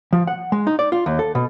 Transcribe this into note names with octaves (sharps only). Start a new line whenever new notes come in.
F3
F#5
G#3
D#4
D5
F4
D#2
A4
B2